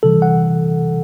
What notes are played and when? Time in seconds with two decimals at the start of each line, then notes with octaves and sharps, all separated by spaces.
0.03 C3 E3 G3 A4
0.22 F#5